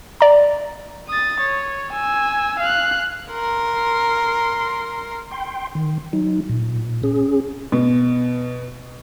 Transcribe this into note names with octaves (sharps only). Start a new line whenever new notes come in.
D5 A#5
D#6 A6
C#5
G#5 E6
F5 F#6
A#4 C6
G5 C6
D#3
F#3 D#4
A#2
C#4 G#4
B2